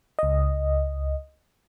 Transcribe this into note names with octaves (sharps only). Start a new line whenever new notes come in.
C#2 D#5